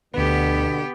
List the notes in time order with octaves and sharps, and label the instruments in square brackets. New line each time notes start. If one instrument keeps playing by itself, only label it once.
[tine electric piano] D2 B4 [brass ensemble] B2 D3 [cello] B3 G4